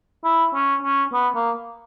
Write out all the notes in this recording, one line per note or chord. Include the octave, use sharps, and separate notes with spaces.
E4
C#4
C#4
B3
A#3